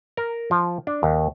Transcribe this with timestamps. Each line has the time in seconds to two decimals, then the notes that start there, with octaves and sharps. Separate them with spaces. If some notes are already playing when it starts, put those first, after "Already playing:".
0.17 A#4
0.51 F3
0.87 D4
1.03 D#2